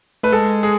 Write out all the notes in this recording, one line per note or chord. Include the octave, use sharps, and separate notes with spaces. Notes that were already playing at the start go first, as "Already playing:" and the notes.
A3 B4
G#3 A4
G#4